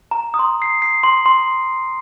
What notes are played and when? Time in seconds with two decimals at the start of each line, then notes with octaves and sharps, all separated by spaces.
0.11 A#5
0.34 D#6
0.39 C6
0.62 C7
0.82 C7
1.03 C6
1.26 C6